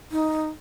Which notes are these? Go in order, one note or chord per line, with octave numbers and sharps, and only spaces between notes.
D#4